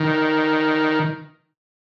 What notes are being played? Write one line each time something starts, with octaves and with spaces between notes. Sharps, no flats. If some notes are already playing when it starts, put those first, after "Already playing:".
Already playing: D#3